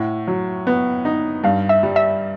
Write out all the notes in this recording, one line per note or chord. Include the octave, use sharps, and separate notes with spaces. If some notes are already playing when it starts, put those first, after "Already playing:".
Already playing: A2 F#5
F#3
B3
D#4
G2 F5
E5
G3
E5